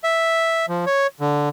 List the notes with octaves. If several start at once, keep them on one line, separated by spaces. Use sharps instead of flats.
E5
F3
C#5
D3